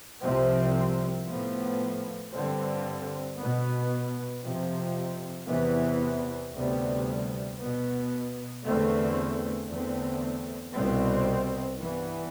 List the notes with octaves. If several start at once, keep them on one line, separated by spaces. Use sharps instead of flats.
C2 C3 F3 C4
A2 F3 B3
G2 D3 G3 C4
B2 B3
F2 C3 F3 C4
E2 C3 E3 B3
D2 C3 G3 B3
B2 B3
E2 D3 A3 C4
E2 D3 A3 C4
C2 B2 G3 C4
G2 E3 B3